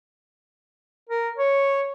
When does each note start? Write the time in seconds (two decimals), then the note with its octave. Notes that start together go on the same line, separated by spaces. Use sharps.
1.09 A#4
1.38 C#5